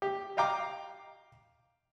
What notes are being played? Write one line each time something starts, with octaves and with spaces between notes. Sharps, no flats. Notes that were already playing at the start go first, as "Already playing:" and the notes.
G4
D#5 F5 G5 A#5 D6